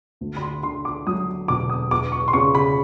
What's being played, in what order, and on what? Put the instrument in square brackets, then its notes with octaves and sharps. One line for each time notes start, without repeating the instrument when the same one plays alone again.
[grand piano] D2
B5
C6
D3 C6
D6
F#3 D#6
E1 D6
D#6
E2 D6
C#6
C6
C#3 C#6
B5